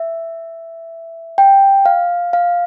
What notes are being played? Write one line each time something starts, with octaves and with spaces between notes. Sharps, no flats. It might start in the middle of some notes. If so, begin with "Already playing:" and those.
Already playing: E5
G5
F5
F5